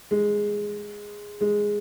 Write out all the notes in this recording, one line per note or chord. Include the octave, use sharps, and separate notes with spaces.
G#3
G#3